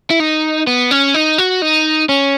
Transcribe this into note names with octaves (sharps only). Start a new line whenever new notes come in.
E4
D#4
B3
C#4
D#4
F#4
D#4
C#4